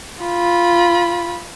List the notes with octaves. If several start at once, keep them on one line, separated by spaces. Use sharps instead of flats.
F4 B5